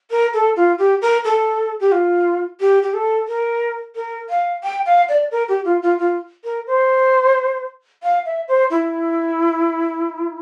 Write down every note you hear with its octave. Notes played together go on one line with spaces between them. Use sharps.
A#4
A4
F4
G4
A#4
A4
G4
F4
G4
G4
A4
A#4
A#4
F5
G5
F5
D5
A#4
G4
F4
F4
F4
A#4
C5
F5
E5
C5
E4